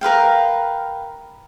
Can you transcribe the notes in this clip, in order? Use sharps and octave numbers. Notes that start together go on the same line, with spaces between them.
A#4 B4 F5 G5